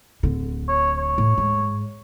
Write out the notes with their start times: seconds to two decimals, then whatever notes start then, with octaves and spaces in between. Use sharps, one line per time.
0.23 D1 D3
0.68 C#5
0.98 C#5
1.18 A2
1.38 G#2